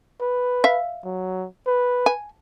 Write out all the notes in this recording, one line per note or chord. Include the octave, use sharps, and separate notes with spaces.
B4
E5 F5
F#3
B4
G#5